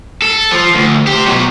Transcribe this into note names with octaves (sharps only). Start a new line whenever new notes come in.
A4
F3
D2
G4 C5
B2 F#3